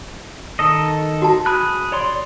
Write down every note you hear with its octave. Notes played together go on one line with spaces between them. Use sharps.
D#3 A4 D#5
F#4 A5
G#4 B5 F#6
C#5 D5 C6